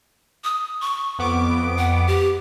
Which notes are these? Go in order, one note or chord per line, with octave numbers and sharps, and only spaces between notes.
D#6
C#6
F2 B3 D6
F#5
G4